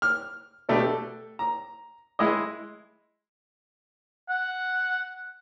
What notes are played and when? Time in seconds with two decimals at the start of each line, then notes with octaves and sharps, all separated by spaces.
0.02 F6
0.69 B2 A3 D4 G4
0.84 A4
1.39 A#5
2.19 G#3 E4 D#5
4.29 F#5